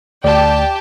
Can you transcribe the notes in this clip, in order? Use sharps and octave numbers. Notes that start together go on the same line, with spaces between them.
D2 G4 D5 G5 A5